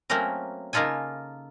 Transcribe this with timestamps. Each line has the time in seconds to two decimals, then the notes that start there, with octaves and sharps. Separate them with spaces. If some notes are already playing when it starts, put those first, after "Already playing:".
0.10 F#3 A3 A#3 C4 C#4 A#4
0.73 C#3 A#3 D#4 F4 A4 G#5